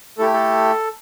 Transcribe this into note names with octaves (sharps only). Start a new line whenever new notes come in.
A3 E4 G4 A4
A4